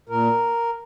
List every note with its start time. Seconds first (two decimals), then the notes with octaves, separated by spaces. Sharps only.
0.09 A#2 A#4